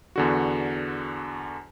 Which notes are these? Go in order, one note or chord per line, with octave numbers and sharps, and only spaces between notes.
E2 D3 F#4